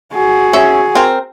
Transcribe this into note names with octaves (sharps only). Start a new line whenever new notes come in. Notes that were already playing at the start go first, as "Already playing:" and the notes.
F#4 G#4
C#4 E5
C4 A#4